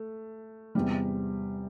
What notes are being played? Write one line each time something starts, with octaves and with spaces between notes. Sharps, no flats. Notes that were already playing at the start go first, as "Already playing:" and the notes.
Already playing: A3
E2 C3 G3